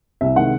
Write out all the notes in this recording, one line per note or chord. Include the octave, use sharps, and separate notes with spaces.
C2 E5
C3 D#3 G#3 F#5